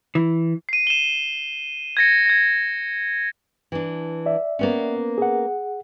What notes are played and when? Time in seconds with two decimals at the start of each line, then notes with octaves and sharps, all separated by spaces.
0.15 E3
0.69 C7 D#7
0.87 E7 G7
1.97 G#6 A#6 C#7
2.26 G#6 A#6
3.72 E3 D4
4.26 D5 E5
4.59 A#3 B3 C#4
5.18 G#4 F#5